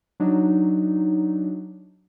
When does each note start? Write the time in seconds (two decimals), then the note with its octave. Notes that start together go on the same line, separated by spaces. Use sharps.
0.20 F#3 D4 D#4